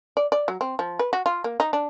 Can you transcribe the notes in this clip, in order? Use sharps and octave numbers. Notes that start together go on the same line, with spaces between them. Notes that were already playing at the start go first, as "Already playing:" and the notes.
D5
D5
F#3
C4
F3
B4
F#4
F4
A#3
D#4
D4